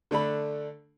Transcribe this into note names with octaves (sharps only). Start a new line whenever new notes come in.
D3 A3 D4 B5